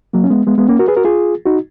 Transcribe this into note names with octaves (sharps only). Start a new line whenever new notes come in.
F#3 A#3
C#4
G#3 B3
G#3 B3
G#3 B3
A#3 C#4
F#4 A#4
G#4 B4
F#4 A#4
F4 G#4
D#4 F#4